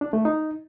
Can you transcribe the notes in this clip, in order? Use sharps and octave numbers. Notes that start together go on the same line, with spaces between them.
D4
A3
D#4